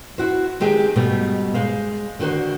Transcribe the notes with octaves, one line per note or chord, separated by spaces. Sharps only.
E4 F#4 C5
D#3 G#3 C4 G4 G#4
G#2 B2 G3 A3
G#3 C5 F5
D3 D#3 F#4 C5